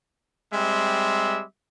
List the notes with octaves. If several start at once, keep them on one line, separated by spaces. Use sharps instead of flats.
G3 G#3 C4 E5